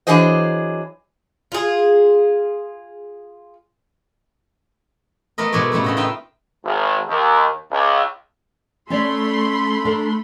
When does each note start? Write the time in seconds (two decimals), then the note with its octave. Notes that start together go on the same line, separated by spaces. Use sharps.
0.07 E3 F#3 D4 G#4 C5 D#5
1.52 F4 G#4
5.38 A3 B3 A#4 D#5
5.52 G#2 B2 A3 C#5 D5
5.72 A2 C#3 G3 A3 E4
5.84 C#3 D#5 F#5
5.97 B3 D#4 F4 E5 G5
6.63 G#1
7.08 D#2
7.71 C#2
8.90 A3 C#4 C#5 D5 B5 C6
9.85 D4 A4 A#4